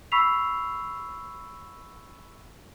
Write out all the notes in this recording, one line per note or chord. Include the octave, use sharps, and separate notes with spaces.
B5 C#6 E6 B6 C7 F7